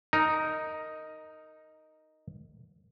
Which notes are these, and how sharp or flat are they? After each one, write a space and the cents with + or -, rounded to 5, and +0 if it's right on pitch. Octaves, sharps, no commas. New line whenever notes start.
D#4 +0 A#4 -15